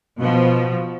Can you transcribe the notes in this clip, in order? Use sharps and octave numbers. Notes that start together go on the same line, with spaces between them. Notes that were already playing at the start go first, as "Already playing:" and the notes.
B2 F3